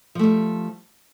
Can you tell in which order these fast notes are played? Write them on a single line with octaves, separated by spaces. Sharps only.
F3 A3 G3